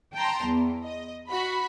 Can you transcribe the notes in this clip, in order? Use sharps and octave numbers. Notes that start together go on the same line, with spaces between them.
G5 A5 A#5 C6
E2
D#5
F#4 B5